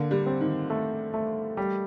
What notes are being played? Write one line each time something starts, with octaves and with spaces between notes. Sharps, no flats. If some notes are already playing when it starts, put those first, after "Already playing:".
Already playing: D3 A#3
G3
C4
D#3
A3
A3
G3